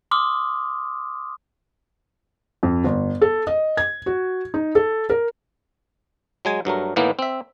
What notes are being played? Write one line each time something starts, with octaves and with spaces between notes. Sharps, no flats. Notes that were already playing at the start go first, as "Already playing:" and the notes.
C6 D6 D#6 F6
F2
G1
A4
D#5
G#6
F#4
D#4
A4
A#4
F#3 G#3 G#5
G2 F#3 A3 A#4
A2 D#3 E3 A#3 B3
C4 E5